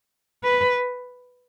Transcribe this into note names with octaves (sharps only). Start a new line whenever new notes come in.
B4